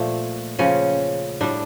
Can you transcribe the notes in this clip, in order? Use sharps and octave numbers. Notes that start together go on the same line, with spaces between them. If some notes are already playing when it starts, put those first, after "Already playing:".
Already playing: A#2 F3 A3
C#3 F3 C#4
A2 G3 D4